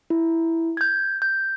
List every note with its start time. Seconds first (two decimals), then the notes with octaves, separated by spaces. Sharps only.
0.10 E4
0.77 G6 G#6
1.22 G6